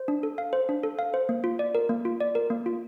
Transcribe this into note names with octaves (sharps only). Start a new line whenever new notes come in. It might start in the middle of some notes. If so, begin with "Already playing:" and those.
Already playing: C5
D4
A4
F5
C5
D4
A4
F5
C5
A#3
F4
D5
A#4
A#3
F4
D5
A#4
A#3
F4